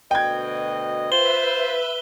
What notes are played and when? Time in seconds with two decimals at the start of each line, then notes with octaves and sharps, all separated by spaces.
0.11 D2 B2 D#5 G5 G#6
1.12 F4 B4 C5 E5 G7